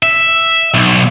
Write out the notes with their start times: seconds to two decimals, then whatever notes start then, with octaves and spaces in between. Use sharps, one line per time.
0.03 E5
0.74 B1